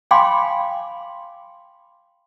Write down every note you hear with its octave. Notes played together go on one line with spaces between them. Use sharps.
F5 G5 G#5 B5 C6 D6